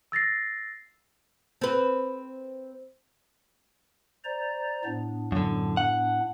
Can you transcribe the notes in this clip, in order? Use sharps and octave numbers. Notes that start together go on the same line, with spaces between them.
E6 A6 A#6 C7
C4 B4
C5 D5 A#5
A2 B3 D4
F#2 D3
F#5